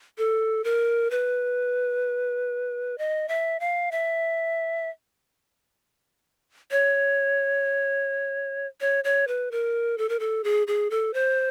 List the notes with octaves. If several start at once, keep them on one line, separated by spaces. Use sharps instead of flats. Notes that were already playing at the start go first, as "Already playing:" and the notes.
A4
A#4
B4
D#5
E5
F5
E5
C#5
C#5
C#5
B4
A#4
A4
A#4
A4
G#4
G#4
A4
C5